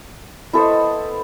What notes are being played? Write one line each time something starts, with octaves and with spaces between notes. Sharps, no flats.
B3 E4 A4 C5 D#5 C#6